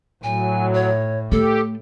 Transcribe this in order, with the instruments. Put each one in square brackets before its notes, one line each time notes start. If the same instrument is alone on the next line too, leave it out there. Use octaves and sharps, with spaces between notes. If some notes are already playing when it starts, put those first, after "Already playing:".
[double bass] A2 [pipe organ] F#3 [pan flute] G#5
[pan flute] C#5
[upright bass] A3 [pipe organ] G4 [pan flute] A4